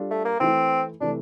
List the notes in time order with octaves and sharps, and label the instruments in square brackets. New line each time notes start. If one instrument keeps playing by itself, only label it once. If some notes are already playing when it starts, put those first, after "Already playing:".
Already playing: [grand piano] G3 D4 F4 A4
[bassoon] A3
A#3
[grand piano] E3 A3 E4 [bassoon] C4
[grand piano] C3 E3 A3 [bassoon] D4